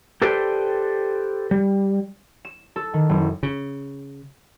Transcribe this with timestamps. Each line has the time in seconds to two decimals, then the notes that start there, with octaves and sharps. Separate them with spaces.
0.22 G4 A4 B4 C5 D5 G5
1.51 G3
2.45 E7
2.76 A4
2.94 D#3
3.09 F#1
3.43 C#3